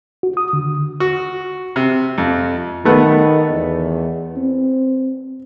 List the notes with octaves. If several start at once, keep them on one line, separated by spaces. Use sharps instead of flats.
F#4
D#6
D3
F#4
C3
F2
D#3 A3 B3
E2
C4